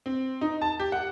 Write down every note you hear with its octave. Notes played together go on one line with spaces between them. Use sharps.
C4
D#4
A5
G4
F#5